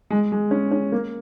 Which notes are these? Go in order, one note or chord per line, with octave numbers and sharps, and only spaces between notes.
G#3
G#3
C#4
C#4
A#3